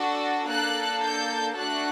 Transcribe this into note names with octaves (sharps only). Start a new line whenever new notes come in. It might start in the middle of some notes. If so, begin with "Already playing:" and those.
Already playing: D4 F#4 A4
A#3 D4 A4 F#6
G6
A3 D4 F#4 A4 F#6